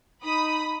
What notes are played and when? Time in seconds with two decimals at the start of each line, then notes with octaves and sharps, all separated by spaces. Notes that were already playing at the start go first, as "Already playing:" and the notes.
0.24 D#4 B5 D#6